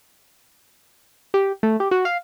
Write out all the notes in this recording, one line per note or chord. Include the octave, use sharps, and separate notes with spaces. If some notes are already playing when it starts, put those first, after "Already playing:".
G4
A3
G4
F#4
F5